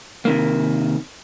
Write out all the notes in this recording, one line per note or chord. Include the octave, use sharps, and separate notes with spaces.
C3 D#3 A#3